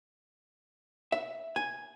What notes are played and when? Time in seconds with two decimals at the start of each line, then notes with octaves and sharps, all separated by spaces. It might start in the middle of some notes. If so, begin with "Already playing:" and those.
1.12 E5
1.56 G#5